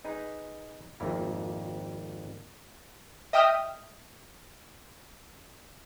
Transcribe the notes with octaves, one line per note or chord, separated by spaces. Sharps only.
D#4 G#4 B4
G#1 F2 A#3 E4 A#5
D#5 E5 G5 D#6 F6